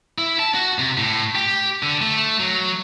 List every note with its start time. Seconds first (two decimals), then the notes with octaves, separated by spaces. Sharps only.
0.18 E4
0.39 A5
0.55 F#4
0.79 C3
0.98 A2
1.35 G4
1.83 D3
2.02 A3
2.40 F#3